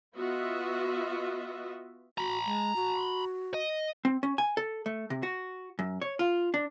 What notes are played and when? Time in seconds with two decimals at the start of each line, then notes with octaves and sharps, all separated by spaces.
0.16 B3 F4 F#4 D#5 E5
2.18 F#4 A#5 B5
2.46 G#3
2.76 F#4
3.54 D#5
4.05 C4
4.23 C#4
4.38 G#5
4.57 A4
4.86 A3
5.10 C3
5.23 F#4
5.79 F#2
6.02 C#5
6.19 F4
6.54 D4